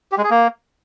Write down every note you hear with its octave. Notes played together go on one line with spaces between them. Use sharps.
G4
G#3
G#4
A#3